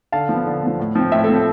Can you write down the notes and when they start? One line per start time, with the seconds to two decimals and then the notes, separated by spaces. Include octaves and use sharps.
0.12 D3 F5 A5
0.29 F3
0.34 B3
0.46 D3
0.62 F3 B3
0.79 A2
0.95 F3 C4
1.12 A2 E5 G5
1.24 A4
1.29 F3 C4
1.35 A4